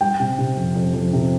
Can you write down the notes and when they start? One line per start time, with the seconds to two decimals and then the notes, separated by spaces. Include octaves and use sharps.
0.01 G3 G5
0.19 C3
0.38 C3
0.57 F2
0.75 F2
0.94 F2
1.13 C3